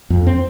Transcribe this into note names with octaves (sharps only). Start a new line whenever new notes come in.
F2
C4